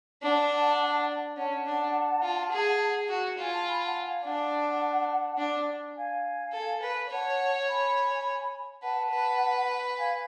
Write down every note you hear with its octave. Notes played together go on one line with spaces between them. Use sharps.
D4 F#5 A5
C#4 F#5 A5
D4
F4
G#4
F#4
F4 G#5
A5
G#5 B5
F#5 A5
F5 G#5
D4 F#5 A5
D4
F5 G#5
A4
B4
C#5 F#5 A5
G#5 B5
B4 F#5 A5
B4
F5 G#5